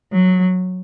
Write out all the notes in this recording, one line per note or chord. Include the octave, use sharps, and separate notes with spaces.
F#3